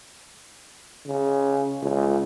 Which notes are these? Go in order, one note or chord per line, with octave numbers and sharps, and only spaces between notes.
C#3
C#2